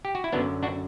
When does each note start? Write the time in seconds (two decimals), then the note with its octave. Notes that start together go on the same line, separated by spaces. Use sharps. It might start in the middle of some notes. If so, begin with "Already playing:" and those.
0.05 G4
0.15 F#4
0.24 E4
0.33 F#2 D3 F#3 B3 D4
0.63 D4 F#4